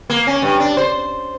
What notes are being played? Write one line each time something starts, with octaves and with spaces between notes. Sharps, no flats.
A#3
C#4
G2
D4
C5